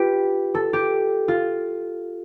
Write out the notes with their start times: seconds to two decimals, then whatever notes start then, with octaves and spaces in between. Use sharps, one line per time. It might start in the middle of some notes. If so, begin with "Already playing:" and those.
Already playing: F4 G4 B4
0.55 A4
0.73 G4
1.28 F4